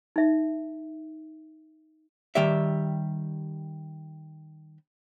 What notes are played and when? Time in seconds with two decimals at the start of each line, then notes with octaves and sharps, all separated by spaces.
0.16 D#4 E5
2.35 D#3 G3 G4 D5 E5